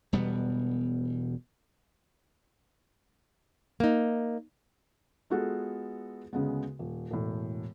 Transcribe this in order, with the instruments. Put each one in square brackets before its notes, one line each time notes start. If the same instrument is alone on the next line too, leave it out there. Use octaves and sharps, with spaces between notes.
[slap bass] E1 B2 G3 B3
[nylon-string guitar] A#3 D#4
[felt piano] G#3 B3 F4 F#4 G#4 A4
D2 C#3 G#3 B3
D#1
E1 A2